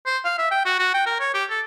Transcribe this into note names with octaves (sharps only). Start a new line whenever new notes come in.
C5
F5
E5
G5
F#4
F#4
G5
A#4
C#5
G4
A4